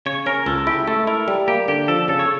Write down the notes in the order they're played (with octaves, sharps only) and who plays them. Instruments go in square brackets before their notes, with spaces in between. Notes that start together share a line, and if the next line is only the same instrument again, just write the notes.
[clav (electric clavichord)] C#3 [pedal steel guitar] C#5
[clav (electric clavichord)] C#4 [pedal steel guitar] A#4
[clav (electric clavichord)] C#2 [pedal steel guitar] A4
[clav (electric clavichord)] E4 [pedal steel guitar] G4
[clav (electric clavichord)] A3 [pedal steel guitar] A4
[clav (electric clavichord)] E4 [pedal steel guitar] A#4
[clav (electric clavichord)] G3
[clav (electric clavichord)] A#3 [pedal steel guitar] G4
[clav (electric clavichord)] D3 [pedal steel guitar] G4
[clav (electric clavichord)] F3 [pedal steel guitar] A4
[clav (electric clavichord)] C#3 [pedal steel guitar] A4
[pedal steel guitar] C#5